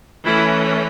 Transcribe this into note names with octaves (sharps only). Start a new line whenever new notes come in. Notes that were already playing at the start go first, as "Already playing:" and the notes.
E3 A3 C#4 E4